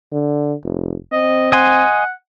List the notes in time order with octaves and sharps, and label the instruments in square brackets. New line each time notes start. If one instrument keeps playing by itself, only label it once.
[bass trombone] D3
F1
[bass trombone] C4 [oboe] D#5
[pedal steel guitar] D#5 G#5 C6 [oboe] F#5